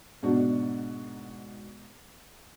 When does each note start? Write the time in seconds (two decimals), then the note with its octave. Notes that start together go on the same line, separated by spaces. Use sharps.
0.23 G#2 B2 D4 F#4